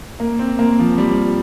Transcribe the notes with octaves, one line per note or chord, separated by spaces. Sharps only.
A#3
C4
A#3
F3
G3